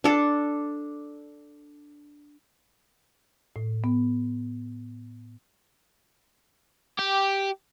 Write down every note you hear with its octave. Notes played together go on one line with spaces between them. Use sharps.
D4 A4
A2
B3
G4